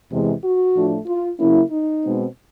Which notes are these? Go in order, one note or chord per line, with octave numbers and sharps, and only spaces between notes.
E2 C3 E3 G#3
F#4
A2 F3 A3 D4
F4
C#3 F#3 A#3 C#4 E4
D#4
B2 G#3 C4